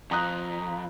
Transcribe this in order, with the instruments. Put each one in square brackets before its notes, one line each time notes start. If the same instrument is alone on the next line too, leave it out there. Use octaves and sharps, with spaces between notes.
[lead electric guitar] F2 [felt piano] A#5 D#6 F#6